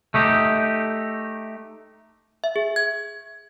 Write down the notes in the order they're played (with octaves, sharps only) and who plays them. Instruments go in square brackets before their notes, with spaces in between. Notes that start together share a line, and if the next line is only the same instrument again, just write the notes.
[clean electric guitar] A3 D#4 G4
[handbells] E5
G#4
G#6